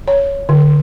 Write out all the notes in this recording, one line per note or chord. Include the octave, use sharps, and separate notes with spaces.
C#5
D3